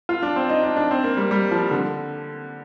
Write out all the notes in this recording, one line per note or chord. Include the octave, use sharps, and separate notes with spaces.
F4
D4
C4
D#4
D4
D4
C4
A#3
G3
G3
F3
D3